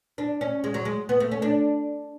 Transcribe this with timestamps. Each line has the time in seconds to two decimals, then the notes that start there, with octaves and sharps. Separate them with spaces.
0.18 D4
0.41 C#4
0.64 G#3
0.74 F#3
0.85 G#3
1.09 B3
1.20 A3
1.31 C#4
1.42 D4